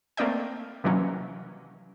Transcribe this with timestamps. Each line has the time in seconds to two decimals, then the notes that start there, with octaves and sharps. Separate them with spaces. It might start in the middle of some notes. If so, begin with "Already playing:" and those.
0.17 A3 A#3 C4 D5 D#5 G5
0.84 C3 D#3 E3 F#3 A#3 C#4